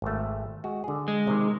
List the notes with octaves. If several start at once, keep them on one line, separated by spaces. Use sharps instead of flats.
G#1 A3
G#3 F#4
D3 G#4
G#3
C3 D#3